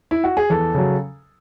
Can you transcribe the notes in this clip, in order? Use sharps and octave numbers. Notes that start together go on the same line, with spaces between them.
E4
F#4
G#4
E2 A4
C#3 F#3